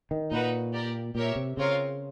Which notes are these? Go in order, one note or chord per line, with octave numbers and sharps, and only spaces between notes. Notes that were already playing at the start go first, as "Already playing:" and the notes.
D#3
A#2 D#4 F#4 B4
G4 A#4 D5
A#2 G4 A#4 C#5 E5
C3
C#3 C4 F4 A#4 C#5 F5